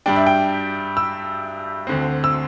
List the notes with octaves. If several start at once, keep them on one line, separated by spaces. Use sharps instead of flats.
G2 G3 D4 G5
E5
G5
E6
D2 D3 C4
E6